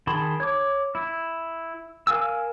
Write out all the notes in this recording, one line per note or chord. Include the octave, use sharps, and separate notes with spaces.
D#3 G#4 A5 B5 C6
C#5 D6
E4
A#4 F5 G#5 E6